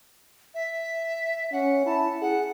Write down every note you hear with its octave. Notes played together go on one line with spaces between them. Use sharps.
E5
C#4 F#5
E4 A5
G#4 F#5